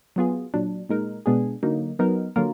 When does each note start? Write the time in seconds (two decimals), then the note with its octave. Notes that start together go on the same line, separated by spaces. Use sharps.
0.16 F#3 B3 F4 G#4
0.54 A#2 F#3 D4
0.89 A#2 G#3 D#4 A#4
1.26 B2 G#3 B3 D4 G#4
1.63 D3 F#3 A#3 D#4
1.99 F#3 B3 D#4 A#4
2.36 D3 F#3 A#3 F4 A#4